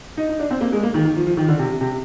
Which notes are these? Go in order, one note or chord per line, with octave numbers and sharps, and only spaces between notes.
D#4
D#4
D4
C4
A#3
G#3
A#3
D#3
D#3
F3
F3
D#3
D3
C3
C3